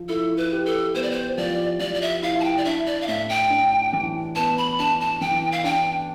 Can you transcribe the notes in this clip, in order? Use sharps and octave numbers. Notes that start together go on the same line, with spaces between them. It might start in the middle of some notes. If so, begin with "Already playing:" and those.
Already playing: F3
E4 A4
B4
G4
A4
B3 C5
D5
C5
F3 D5
F3 D5
D5
E5
E4 F5
A5
G5
D5
D4 E5
D5
F5
A2 E5
G5
D4
E3
B3 A5
B5
D4 A5
A5
E3 G5
F5
D4 G5